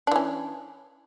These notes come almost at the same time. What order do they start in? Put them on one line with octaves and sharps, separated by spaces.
D4 E3 C#4